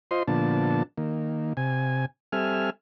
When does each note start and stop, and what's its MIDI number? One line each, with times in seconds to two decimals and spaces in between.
0.11 0.23 65
0.11 0.23 72
0.11 0.23 75
0.11 0.23 84
0.28 0.83 46
0.28 0.83 50
0.28 0.83 53
0.28 0.83 59
0.28 0.83 62
0.28 0.83 81
0.98 1.53 51
0.98 1.53 58
1.57 2.05 48
1.57 2.05 80
2.32 2.70 55
2.32 2.70 60
2.32 2.70 69
2.32 2.70 76
2.32 2.70 80
2.32 2.70 89